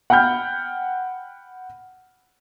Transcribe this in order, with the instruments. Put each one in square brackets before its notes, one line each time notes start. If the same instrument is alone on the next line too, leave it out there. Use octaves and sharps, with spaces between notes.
[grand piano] F#5 G5 B5 F6 G6